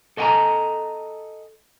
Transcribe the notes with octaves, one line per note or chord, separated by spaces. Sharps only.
A4 D#5 F5 G5 G#5 A#5